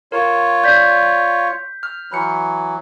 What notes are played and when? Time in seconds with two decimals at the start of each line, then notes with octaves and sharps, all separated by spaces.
0.12 F4 A#4 C#5
0.64 D5 G6 B6
1.83 F6
2.12 E3 F#3 B5 F#6 C#7